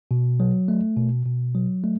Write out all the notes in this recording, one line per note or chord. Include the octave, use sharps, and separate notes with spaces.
B2
F#3
A3
B2
B2
F#3
A3